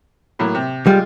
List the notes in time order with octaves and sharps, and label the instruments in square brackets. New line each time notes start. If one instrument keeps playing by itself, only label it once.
[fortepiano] A2 F#3 A#3
C3
[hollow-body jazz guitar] G3 [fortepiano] G#3 F4